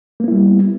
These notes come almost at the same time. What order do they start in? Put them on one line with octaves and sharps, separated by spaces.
A#3 B3 E4 G3